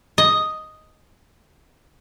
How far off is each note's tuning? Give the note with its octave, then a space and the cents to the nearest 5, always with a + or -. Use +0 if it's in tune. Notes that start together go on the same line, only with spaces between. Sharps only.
D#5 +0